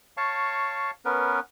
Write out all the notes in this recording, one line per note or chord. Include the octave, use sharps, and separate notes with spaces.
C#5 F5 A5 C#6
B3 C#4 A#4 B4